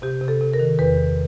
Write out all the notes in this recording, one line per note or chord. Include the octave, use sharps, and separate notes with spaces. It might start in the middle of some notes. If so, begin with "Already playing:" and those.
C3 G4
C3
A4
C3
A#4
D#3
E2 B4
E2